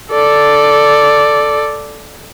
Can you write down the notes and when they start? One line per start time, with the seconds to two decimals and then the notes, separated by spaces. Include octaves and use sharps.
0.11 A4 D5